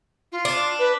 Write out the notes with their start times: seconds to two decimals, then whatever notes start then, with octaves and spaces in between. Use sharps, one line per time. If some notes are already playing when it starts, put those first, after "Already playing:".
0.32 F4
0.45 D4
0.79 B4